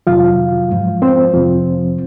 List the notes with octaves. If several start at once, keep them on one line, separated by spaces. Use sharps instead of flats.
F2 C3 D#3 F#3 F4 F5
G#2 F3
C4 C5
F2 C3 F3